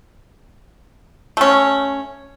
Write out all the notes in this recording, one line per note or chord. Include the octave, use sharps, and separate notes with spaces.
A3 C#4